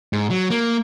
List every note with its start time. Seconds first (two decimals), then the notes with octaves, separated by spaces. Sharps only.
0.13 G#2
0.30 F#3
0.50 A#3